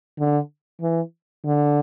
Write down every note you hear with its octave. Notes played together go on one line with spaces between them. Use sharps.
D3
E3
D3